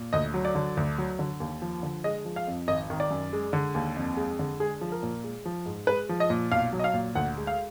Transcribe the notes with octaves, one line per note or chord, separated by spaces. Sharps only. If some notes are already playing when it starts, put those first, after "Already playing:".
Already playing: A#2
D2 D#5
F#3
D5
D3
D2
F#3
D3
D#2
F3
D3
G#3 D#5
F3
F5
F2
G#1 D#5
D#3
D5
F#2
G#3
D3
D#2
F2
G#3
D3
G#3 G#4
F3
A#4
A#2
G#3
F3
G#2
G#3 B4
F3
D#5
A#2
B1 F5
F#3
D#5
F5
A#2
D2 F#5
G#3
F5